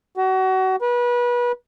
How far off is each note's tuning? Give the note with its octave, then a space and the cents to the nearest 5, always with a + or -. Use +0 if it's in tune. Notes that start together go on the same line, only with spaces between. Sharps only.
F#4 +30
B4 -30